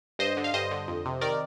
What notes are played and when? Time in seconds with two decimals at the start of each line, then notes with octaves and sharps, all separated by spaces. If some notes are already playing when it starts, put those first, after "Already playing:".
0.19 G2 C5 D#5
0.37 D3
0.44 F5
0.54 G2 C5 D#5
0.71 D3
0.87 F2
1.06 C3
1.21 D#3 A#4 D5